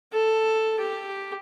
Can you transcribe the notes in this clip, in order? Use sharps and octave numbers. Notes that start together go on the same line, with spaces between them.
A4
G4